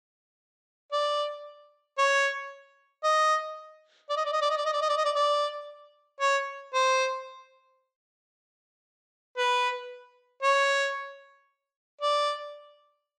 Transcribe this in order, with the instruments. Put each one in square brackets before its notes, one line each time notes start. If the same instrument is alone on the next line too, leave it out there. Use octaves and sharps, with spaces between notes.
[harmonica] D5
C#5
D#5
D5
D#5
D5
D#5
D5
D#5
D5
D#5
D5
D#5
D5
D#5
D5
D5
C#5
C5
B4
C#5
D5